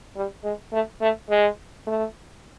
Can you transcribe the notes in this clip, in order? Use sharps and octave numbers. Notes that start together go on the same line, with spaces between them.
G3
G#3
A3
A3
G#3
A3